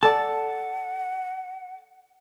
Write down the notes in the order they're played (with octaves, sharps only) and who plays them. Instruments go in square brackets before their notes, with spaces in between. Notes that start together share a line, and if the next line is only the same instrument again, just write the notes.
[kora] A4 D5 [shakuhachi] F#5 [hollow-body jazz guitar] A5